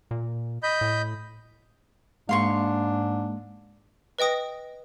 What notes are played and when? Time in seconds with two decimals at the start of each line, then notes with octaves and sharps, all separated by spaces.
0.11 A#2
0.63 D#5 B5 G6
0.81 A2
2.29 G#2 G#3 A#3 D4 F5 C6 C#6
4.19 B4 D#5 G5 D#6 A#6